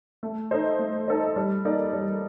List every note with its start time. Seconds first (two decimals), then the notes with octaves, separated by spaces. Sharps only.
0.23 A3
0.51 D#4 A4 C5 D#5
0.79 A3
1.08 D#4 A4 C5 D#5
1.36 G3
1.65 A#3 D#4 A4 D5
1.93 G3